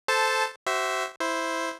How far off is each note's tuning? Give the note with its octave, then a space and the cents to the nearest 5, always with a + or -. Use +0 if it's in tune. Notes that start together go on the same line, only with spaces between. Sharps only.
A4 -10 C5 -10 A5 +0
F#4 +35 C5 -5 E5 +0
E4 +0 C5 +0